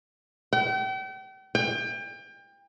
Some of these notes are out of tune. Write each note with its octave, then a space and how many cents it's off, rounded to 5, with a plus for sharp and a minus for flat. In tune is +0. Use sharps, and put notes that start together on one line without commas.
G5 -40
G5 +30